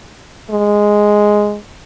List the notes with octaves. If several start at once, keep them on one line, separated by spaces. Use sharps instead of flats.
G#3